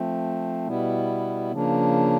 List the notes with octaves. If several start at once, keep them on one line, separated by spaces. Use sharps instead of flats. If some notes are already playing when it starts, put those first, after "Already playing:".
Already playing: F3 A3 C4
B2 G3 B3 E4
C#3 F3 A#3 D4